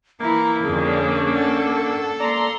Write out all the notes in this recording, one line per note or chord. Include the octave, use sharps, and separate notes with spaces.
E3 A#3 E4 A#5
F2 D3 C#4 D4 G#4
A4 F#5
A#3 D5 A#5 C6